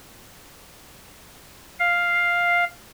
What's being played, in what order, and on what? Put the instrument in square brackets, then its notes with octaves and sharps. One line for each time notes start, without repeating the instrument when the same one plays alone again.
[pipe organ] F5